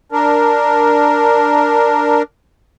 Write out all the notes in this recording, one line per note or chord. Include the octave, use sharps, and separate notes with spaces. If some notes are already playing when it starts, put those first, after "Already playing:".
D4 A#4